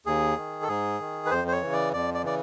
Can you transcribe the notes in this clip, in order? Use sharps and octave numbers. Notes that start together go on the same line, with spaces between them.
D#2 G#4
D#3
A4
G#2 G#4
D#3
B4
F2 C5
C5
C#5
C#3 E3
D5
F2 D5
D5
C#3 E3 D5